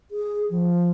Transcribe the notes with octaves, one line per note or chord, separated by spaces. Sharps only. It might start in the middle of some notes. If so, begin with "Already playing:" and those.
G#4
F3